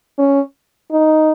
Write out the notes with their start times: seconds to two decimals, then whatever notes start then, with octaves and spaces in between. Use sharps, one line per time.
0.19 C#4
0.91 D#4